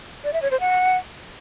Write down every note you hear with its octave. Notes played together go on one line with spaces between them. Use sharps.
D5
E5
C#5
C5
F#5